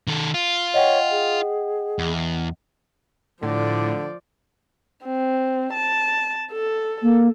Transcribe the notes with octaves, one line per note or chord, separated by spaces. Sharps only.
D#3 A4
F4
C#5 D#5 F#5 G5
G#4
E2
A2 D3 F3 D5
C4
A5
A4
A#3